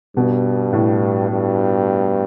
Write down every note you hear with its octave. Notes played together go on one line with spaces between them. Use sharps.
G2 B2
A2
G2